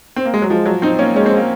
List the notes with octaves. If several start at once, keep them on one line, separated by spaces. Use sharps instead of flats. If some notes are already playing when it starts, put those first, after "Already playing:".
C4
A#3
G#3
F#3
F3 G#3
F#3
C4 D#4
A#3 C#4
G#3 C#4
C4
A#3